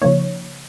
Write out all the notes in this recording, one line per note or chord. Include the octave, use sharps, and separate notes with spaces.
C#3 F3 A#3 D#4 C#5